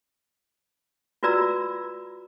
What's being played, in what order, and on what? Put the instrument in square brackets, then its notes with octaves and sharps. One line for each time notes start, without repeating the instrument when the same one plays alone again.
[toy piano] F4 F#4 B4 D5 A#5 E6